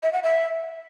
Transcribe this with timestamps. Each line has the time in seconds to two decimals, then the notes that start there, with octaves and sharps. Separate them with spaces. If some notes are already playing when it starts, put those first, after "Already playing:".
0.03 E5
0.13 F#5
0.23 E5